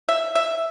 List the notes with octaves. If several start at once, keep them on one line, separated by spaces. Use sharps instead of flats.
E5
E5